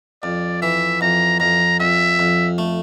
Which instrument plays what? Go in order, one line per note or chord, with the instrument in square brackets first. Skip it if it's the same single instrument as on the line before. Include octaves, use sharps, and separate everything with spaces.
[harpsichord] F2 [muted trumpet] D5
[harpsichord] E3 [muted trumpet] E5
[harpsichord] F2 [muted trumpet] A#5
[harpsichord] F2 [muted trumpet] A#5
[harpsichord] F2 [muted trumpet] E5
[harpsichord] F2
A3